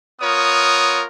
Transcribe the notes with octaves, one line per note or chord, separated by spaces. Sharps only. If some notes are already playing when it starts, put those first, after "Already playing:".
B3 F4 A#4 C#5 D#6